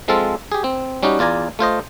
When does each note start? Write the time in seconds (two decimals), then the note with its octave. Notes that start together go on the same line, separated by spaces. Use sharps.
0.08 F3 G#3 C4 F4 A4
0.52 G4 G#4
0.64 C4
1.03 G3 C#4 D#4 F#4 G4
1.19 E2 F4 D5 G#5 A#5
1.59 A3 F4 C5 D#5